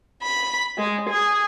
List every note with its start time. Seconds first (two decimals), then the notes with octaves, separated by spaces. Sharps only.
0.22 B5
0.77 G#3
1.09 G#4